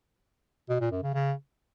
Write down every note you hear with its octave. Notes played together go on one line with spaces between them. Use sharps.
B2
A#2
F#2
C#3
C#3